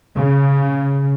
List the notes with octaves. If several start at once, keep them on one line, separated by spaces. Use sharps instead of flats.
C#3